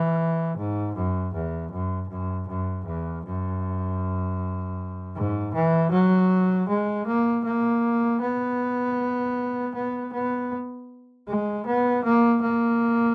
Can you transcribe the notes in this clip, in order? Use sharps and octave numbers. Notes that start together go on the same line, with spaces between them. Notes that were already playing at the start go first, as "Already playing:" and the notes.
Already playing: E3
G#2
F#2
E2
F#2
F#2
F#2
E2
F#2
G#2
E3
F#3
G#3
A#3
A#3
B3
B3
B3
G#3
B3
A#3
A#3